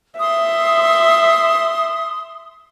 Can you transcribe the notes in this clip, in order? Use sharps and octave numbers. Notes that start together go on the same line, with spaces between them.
E5 C6 D#6